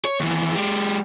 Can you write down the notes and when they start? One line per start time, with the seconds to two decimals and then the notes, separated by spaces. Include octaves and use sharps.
0.05 C#5
0.20 D#2 E3
0.55 G#3 G4